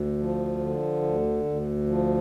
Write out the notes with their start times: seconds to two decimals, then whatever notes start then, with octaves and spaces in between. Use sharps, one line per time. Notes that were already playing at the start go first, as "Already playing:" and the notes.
Already playing: D2
0.19 F3
0.60 D3
1.02 D2
1.45 D2
1.87 F3